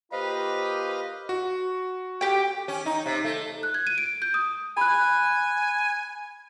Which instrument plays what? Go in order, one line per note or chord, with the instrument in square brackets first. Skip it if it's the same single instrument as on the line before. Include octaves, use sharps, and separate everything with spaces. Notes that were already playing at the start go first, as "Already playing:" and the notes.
[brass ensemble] A#3 F4 G4 [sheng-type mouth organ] B4 D#5 F5 [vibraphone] C5 [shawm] B5
[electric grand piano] F#4
[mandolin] G4 G5
[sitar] C#4
D#4
C3
A3
[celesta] F#6
G#6
D#7
D7
G6
D#6
[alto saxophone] G#5 [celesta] B5 F#6